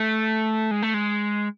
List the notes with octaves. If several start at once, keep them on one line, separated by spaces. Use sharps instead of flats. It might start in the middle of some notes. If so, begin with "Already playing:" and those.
Already playing: A3
G#3
A3
G#3